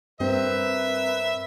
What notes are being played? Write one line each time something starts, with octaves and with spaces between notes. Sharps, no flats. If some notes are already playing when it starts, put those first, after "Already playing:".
G2 C4 A#4 B4 E5